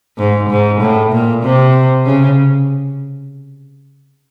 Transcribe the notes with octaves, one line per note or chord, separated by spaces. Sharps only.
G#2
G#2
A2
A#2
C3
C#3